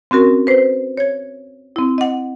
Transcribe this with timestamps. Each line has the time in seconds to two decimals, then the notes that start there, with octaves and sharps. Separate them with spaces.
0.11 C4 C#4 F#4 A#4
0.47 B4 C5
0.98 C#5 G#6
1.76 C4 E4
1.98 D#5 F#5